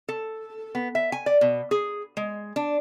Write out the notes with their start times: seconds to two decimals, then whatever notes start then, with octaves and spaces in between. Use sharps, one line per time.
0.09 A4
0.75 B3
0.95 E5
1.12 G#5
1.26 D5
1.41 B2
1.71 G#4
2.17 G#3
2.56 D4